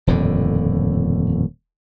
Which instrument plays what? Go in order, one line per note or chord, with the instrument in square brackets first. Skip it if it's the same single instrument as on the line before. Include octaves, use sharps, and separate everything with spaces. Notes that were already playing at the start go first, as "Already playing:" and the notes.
[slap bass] D#1 F2 A2 D3